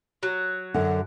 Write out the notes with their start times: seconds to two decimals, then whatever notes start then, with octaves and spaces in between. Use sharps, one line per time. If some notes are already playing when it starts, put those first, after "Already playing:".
0.23 F#3
0.74 F#2 D3